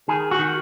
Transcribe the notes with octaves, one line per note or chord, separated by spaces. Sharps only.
D#3 G#4
F#4
D#3